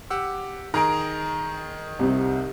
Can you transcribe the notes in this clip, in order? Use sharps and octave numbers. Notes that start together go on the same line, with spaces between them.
G4 F#5 E6
D#3 G#4 A#5 D7
C2 C3